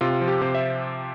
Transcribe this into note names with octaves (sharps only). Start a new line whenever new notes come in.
C3 F4
F3
G4
C3 C5
E5